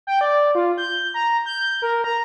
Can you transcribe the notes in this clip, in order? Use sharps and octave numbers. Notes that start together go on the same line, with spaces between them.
G5
D5
F4
G6
A#5
G6
A#4
A#5